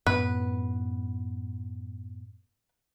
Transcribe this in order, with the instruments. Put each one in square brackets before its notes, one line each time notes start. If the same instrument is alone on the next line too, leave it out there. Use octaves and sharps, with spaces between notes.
[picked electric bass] F#2 A2 B3 [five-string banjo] B4